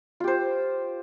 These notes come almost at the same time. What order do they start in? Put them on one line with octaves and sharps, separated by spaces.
F4 G4 C5